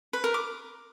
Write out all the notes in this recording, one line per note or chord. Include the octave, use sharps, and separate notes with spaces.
B4
A#4
D6